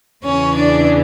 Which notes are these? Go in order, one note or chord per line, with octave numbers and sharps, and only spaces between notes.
E2 C#3 E3 C#4 C#5
D4 D5